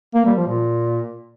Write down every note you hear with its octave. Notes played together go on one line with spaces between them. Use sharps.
A#3
G3
F3
A#2